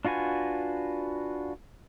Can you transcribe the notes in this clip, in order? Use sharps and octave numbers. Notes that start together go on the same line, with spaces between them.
D4 F4 F#4 B4 G#5